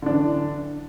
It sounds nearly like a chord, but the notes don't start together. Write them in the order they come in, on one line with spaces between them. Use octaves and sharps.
D3 D4 E3